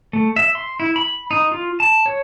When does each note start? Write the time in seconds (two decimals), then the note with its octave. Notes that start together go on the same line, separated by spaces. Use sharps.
0.13 A3
0.36 E5
0.55 C6
0.80 E4
0.96 B5
1.31 D#4
1.51 F4
1.80 A5
2.06 C#5